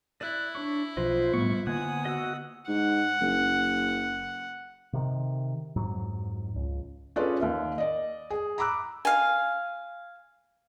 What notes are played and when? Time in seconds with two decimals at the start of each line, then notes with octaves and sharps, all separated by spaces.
0.21 E4 D5 F#6
0.55 D4 C#5 C#6
0.97 B1 F3 F4 B4 C5 D#5
1.33 A2 G3 B3 C#6
1.67 D3 A#3 B3 F#5 G#5 D#6
2.05 F#4 D#5 F#5 E6
2.68 G#2 F#5
3.21 F#1
4.93 C3 D#3
5.76 F2 G#2 F#3
6.56 C#2
7.16 C#4 F4 G#4 A4 B4 D5
7.41 D#2 E5
7.78 D5 D#5
8.30 G#4
8.58 A#5 B5 D6 E6 F#6
9.05 F5 G#5